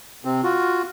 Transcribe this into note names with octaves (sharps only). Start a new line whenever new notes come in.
C3 C4
F4 F#4